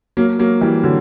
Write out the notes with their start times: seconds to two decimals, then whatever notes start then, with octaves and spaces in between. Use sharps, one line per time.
0.17 F#3 A#3
0.39 F#3 A#3
0.61 E3 G3
0.83 D3 F#3